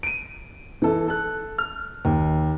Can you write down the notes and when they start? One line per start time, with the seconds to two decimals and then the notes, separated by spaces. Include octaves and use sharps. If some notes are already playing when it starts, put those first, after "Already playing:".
0.03 D7 D#7
0.82 E3 A4
1.08 A4 F#6
1.58 F6
2.05 D#2